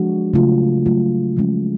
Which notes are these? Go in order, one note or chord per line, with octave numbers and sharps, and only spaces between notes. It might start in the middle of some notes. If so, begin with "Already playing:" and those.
Already playing: F3 G#3 D4 F#4
C#3 F#3 A3 F4
C#3 F#3 A3 F4
C#3 F3 G#3 C#4